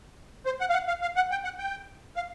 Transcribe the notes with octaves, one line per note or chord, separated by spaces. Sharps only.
C5
F#5
F5
F#5
F5
F5
F#5
G5
F#5
G5
F5